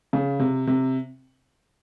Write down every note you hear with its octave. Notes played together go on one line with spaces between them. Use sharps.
C#3
C3
C3